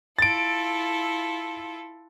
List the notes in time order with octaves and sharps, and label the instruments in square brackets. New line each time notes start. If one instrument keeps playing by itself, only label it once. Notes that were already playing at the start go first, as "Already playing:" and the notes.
[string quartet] E4 F4 A4 [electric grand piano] A6 D7